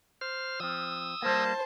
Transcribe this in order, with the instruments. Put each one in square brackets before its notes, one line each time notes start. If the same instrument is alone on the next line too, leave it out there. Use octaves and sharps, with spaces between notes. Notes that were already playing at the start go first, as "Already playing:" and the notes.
[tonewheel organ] C5 F6
[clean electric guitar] F3 C4 [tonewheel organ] D#6 E6
[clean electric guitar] G3 A#3 [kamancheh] C5 A5